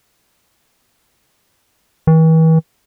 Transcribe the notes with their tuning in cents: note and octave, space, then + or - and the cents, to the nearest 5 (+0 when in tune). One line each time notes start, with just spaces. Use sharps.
E3 -40